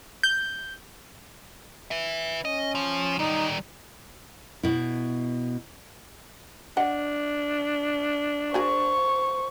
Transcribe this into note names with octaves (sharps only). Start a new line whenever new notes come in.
G6
B4 E5
C#4 D#5
F3
D#3 G3 D#4
B2 E4
D4 D#5 F#5
F#4 G#4 A#4 C5 C#6